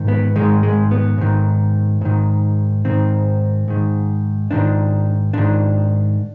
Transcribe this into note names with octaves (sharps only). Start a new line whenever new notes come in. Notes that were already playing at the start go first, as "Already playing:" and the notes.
Already playing: G#2 D#3
B3
G#2 D#3 G#3
G#3
B3
G#2 D#3
G#2 D#3
G#2 D#3 C4
G#2 D#3
G#2 D#3 D4
G#2 D#3 D4